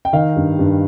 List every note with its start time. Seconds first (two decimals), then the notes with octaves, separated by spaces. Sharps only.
0.05 G5
0.13 D#3 F5
0.36 G2
0.59 G2